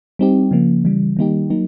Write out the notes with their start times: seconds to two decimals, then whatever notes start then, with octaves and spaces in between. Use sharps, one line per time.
0.19 G3 C4 D#4 G4
0.51 C#3 F3 A#3
0.85 C#3 E3 G3
1.17 D#3 G3 A#3 D#4 G4
1.50 F#3 A#3 D#4